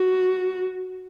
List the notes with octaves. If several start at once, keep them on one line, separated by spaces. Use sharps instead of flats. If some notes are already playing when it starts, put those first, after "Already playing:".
Already playing: F#4